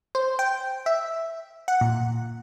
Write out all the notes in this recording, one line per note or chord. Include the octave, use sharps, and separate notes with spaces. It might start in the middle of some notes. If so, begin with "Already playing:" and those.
C5
G5
E5
F#5
A#2